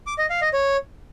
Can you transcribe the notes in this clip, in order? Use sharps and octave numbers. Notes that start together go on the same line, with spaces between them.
D6
D#5
F5
D#5
C#5